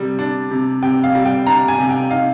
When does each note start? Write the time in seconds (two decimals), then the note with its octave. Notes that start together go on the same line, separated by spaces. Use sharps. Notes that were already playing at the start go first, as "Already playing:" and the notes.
Already playing: C3 G3
0.19 D4
0.51 C3
0.83 C3 G5
1.04 F5
1.15 G3
1.25 G5
1.46 D4 A#5
1.68 G#5
1.78 C3
1.89 G5
2.11 D#4 F5